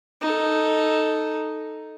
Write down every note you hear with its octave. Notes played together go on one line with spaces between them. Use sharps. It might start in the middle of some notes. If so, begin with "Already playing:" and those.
D#4 A4